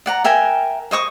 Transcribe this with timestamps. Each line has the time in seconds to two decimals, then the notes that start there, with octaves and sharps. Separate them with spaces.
0.06 D5 F#5 A#5
0.24 A#4 E5 G5 G#5
0.91 C5 D#5 C#6 D#6